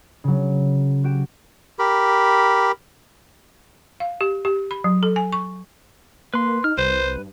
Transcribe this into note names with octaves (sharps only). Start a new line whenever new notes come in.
C#3 F#3
F#4 G4 D7 E7
G4 A#4 B5
F5
G4
G4
B5
F#3
A4
G#5
C#6
A#3 B4 C6
D#4 F6
C2 B4 C5
G2